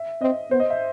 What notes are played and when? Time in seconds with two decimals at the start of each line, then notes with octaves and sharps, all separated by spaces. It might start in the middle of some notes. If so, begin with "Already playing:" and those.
Already playing: E5
0.21 C4 D#5
0.51 B3 C5
0.60 D#5
0.70 E5